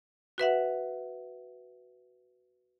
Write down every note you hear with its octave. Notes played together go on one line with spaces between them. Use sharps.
F#4 B4 E5 F#5